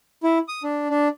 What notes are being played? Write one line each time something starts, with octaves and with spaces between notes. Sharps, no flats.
E4
D#6
D4
D4